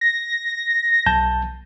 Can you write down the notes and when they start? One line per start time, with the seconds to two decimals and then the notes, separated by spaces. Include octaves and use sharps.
0.01 A#6
1.07 B1 A5 G6